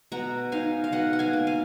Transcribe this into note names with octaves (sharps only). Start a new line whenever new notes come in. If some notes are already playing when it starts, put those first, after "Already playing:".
B2 F#5 A#5
D#4 F5 G#5
F5
B2 D#5 F#5
F#5
F5 G#5
A#3
F5 G#5